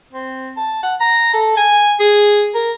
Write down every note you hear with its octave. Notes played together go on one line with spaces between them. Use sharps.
C4
A5
F#5
A#5
A4
G#5
G#4
A#4